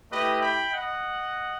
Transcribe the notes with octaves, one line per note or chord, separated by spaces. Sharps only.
A3 E4 G4 B4 D#5
G5 B5
D#5 F#5